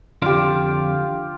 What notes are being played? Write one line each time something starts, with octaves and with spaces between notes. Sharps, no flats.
F2 D3 F4 G4 D5